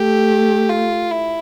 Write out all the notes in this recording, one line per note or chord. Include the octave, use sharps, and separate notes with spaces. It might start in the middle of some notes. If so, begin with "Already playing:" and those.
Already playing: A3 G4
F4
E4